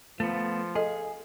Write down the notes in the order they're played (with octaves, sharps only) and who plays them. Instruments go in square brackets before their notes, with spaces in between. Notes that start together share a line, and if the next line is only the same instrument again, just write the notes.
[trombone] F3 [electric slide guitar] A3 B3
[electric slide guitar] G#4 [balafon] A4 D#5